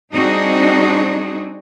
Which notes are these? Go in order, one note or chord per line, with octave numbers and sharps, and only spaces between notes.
G3 C4 D4 D#4 F#4 G#4